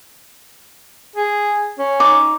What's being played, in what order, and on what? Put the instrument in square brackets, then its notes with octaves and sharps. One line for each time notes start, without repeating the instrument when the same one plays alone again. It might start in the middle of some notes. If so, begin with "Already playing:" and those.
[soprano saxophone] G#4
C#4
[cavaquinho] D#4 D6